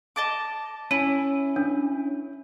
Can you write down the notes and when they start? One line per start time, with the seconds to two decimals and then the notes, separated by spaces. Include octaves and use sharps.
0.16 D#5 A5 D6
0.91 C#4 E4 D#7
1.56 D4